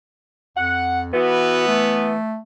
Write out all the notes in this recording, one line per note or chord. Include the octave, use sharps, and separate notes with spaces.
F2 F#5
E3 B3 F#4
A3